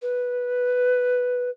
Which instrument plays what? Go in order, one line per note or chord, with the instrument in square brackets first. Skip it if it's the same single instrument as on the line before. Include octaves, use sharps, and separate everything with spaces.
[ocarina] B4